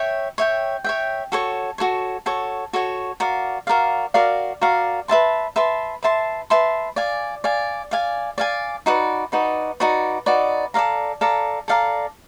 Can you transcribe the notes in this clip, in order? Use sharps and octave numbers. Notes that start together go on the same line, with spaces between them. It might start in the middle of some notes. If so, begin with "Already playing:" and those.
Already playing: C#5 E5 G5
C#5 E5 G5
C#5 E5 G5
F#4 A4 C#5
F#4 A4 C#5
F#4 A4 C#5
F#4 A4 C#5
F#4 A#4 D5 F5
F#4 A#4 D5 F5
F#4 A#4 D5 F5
F#4 A#4 D5 F5
B4 E5 A5 C6
B4 E5 A5 C6
B4 E5 A5 C6
B4 E5 A5 C6
D5 F5 G#5
D5 F5 G#5
D5 F5 G#5
D5 F5 G#5
D#4 F#4 B4 D5
D#4 F#4 B4 D5
D#4 F#4 B4 D5
D#4 F#4 B4 D5
A4 D5 F5 A#5
A4 D5 F5 A#5
A4 D5 F5 A#5